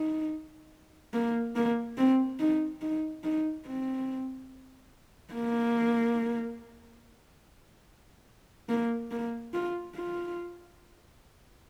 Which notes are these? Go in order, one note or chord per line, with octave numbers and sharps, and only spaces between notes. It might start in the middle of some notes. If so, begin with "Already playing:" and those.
Already playing: D#4
A#3
A#3
C4
D#4
D#4
D#4
C4
A#3
A#3
A#3
F4
F4